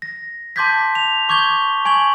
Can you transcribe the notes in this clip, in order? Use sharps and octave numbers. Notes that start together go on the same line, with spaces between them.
A#6
A5 C6 D6 G6 G#6 B6
F7
C#6 D6 G6 G#6 G7
G#5 C#6 G#6 F#7